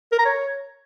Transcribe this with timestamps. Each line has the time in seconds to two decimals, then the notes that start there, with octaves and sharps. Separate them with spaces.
0.12 A#4
0.19 A#5
0.25 C#5